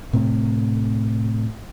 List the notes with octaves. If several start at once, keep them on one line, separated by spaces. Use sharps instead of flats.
A2 C3 A3